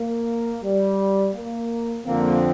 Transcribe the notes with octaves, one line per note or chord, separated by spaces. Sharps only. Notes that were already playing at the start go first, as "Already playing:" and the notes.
Already playing: A#3
G3
A#3
F2 D3 F3 A#3 C4